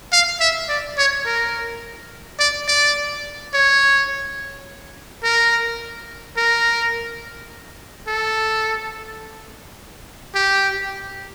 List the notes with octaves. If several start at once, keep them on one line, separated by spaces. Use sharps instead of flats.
F5
E5
D5
C#5
A#4
D5
D5
C#5
A#4
A#4
A4
G4